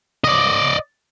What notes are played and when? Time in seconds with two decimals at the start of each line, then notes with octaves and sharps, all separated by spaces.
0.24 D5 D#5